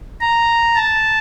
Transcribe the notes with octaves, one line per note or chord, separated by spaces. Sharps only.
A#5
A5